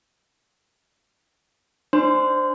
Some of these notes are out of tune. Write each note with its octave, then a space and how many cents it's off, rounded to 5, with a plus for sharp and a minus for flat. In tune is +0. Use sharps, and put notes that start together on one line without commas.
D4 +20 C5 +0 C6 -25